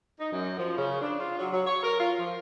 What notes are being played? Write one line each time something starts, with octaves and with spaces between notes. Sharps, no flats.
D#4
F#2
F3
C#3
D4
F4
F#3
F#3
C#5
A#4
F4
F3